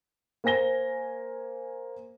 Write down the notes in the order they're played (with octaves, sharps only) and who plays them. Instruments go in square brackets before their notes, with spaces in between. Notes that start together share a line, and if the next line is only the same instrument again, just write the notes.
[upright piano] A#3 C5 G#5 A#6 G7